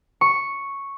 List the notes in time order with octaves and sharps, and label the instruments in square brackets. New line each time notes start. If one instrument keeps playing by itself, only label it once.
[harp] C#6